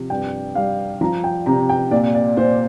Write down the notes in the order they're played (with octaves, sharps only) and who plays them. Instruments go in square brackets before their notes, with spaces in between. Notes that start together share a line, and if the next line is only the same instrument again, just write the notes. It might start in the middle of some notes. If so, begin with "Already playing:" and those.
Already playing: [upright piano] C3 F3
G2 G5
G3 F5
F3 A#5
G5
C3 A#5
G5
A#2 D5
D5
A#2 C5